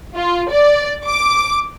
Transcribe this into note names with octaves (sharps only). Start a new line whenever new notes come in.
F4
D5
D6